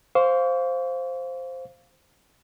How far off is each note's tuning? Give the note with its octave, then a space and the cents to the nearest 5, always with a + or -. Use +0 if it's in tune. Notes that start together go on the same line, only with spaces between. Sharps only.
C5 +0 F5 +0 C#6 +45